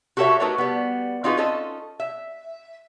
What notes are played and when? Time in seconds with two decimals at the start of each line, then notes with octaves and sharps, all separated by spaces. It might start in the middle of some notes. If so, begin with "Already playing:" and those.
0.17 F#4 G4 A4 A#4 C#5 E5
0.40 A3 D#4 F#4 A#4 B4 C#5
0.58 G3 B3
1.24 C4 D#4 F4 F#4 G#4 B4
1.37 C#4 D#4 F4 A4 D#5
2.00 E5